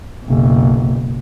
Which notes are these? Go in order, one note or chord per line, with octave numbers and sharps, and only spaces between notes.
F#1 B1